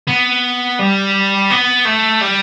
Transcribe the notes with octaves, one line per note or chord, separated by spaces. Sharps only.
B3
G3
B3
A3
G3